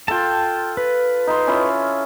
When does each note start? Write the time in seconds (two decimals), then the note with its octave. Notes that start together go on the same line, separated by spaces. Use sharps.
0.08 F4 A4 G5 A5
0.77 B4
1.27 D#4 C6
1.47 C#4 E4 F4